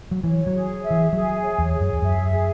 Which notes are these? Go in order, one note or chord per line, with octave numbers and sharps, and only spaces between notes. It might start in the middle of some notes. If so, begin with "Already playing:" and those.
F#3
E3 C#5
F#3
G#4
E5
E3
F#3 G#4
C#5
E2
G#4
F#2
E2
F#2 E5
G#4